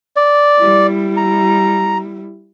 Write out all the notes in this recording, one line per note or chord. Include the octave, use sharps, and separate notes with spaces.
D5
G3 E4
A#5